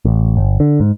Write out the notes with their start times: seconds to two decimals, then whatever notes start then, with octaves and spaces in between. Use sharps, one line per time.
0.05 A1
0.37 G1
0.60 D3
0.80 G#2